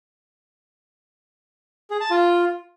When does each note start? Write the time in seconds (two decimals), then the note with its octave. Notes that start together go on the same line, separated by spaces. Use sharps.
1.90 G#4
2.00 A5
2.10 F4